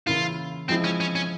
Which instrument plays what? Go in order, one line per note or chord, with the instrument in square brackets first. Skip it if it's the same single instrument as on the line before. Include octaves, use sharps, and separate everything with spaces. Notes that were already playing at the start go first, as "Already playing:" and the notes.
[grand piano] C#3 E3 A#3 E4 [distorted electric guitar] F4
[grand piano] F3 G#3 E4 [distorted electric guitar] C4
[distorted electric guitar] C#4
C#4
C#4